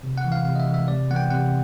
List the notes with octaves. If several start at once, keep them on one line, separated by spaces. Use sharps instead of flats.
C3
F#5
E3 G#3
F5
C3 F5
D#5
E5
E3 G#3
E5
C3 D5
E3 G#3 B3 F#5
G5
C3 F#5